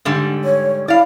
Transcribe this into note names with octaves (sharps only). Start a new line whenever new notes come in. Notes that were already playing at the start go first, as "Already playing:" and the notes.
G#2 D3 G3
C#5
E4 D5 F5